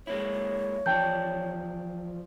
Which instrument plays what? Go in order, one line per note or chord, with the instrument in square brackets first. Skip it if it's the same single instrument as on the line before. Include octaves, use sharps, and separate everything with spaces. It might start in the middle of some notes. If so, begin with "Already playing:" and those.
[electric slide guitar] G#3 A#3 E4 [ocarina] C#5
[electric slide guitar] E3 F3 D5 [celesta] G5 A5 G6